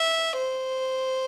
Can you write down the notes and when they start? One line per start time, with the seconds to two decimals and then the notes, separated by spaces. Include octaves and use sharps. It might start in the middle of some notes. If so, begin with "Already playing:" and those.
Already playing: E5
0.37 C5